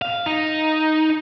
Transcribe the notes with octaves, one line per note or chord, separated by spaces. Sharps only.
F5
D#4